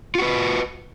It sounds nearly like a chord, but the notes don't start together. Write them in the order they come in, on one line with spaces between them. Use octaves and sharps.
F4 F#4 B4